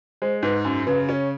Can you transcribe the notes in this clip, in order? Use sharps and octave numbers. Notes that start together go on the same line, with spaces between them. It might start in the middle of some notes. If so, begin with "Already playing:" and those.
G#3 C5
G#2 B4
F#2
C#3 B4
C#4 C#5